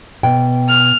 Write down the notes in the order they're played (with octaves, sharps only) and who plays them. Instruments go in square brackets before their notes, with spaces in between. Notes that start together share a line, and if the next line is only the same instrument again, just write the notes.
[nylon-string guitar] B2 G5
[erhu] F6